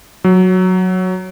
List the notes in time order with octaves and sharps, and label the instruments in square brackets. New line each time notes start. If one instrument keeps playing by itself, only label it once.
[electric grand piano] F#3